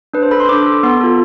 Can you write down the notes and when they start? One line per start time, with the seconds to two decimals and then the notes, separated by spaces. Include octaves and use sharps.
0.14 D4 B4
0.23 C5
0.31 A4 B5
0.40 C6
0.49 D4 D6
0.66 A4
0.83 B3 C6
1.01 F4 A4